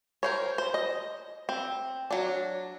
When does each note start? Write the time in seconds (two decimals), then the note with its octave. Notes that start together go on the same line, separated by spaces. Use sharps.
0.23 A#4 C5 C#5
0.58 C5
0.74 D#5
1.49 C4
2.11 F#3 D4